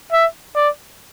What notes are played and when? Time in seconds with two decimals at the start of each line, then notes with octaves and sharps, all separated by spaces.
0.12 E5
0.56 D5